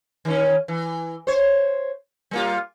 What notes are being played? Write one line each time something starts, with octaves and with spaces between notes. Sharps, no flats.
D#3 C#4
E3
C5 C#5
G3 A#3 F4